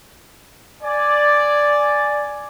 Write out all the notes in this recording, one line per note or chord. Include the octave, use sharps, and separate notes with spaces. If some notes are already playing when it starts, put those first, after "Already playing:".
D5 G#5